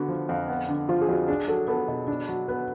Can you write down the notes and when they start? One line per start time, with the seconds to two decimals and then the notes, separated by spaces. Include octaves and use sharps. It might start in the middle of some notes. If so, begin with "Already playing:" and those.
Already playing: D3 B3 F#4
0.09 F3
0.29 F2
0.48 B3
0.68 D3
0.89 F3 F4
1.01 G#4
1.09 F2 F#4
1.28 D4 G#4
1.48 F#3 A4
1.68 B3 A4
1.88 B2
2.08 D4
2.28 F#3
2.48 B3 B4